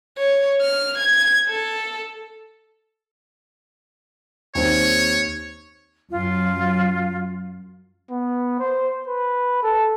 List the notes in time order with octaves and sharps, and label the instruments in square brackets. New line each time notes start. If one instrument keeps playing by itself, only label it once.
[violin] C#5
F6
G#6
A4
[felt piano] D#2 C4 [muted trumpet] C#5
[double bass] F#2 F#3 [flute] F4
[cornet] B3
C5
B4
A4